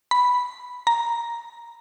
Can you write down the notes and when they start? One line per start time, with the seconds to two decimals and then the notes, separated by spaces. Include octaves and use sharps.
0.11 B5
0.87 A#5